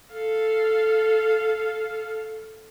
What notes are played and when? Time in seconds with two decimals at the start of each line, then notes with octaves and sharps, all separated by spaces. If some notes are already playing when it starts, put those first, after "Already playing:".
0.14 A4 F5